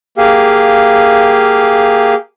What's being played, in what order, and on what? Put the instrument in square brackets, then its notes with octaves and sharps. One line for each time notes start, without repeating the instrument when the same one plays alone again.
[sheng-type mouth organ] A#3 G4 G#4 F5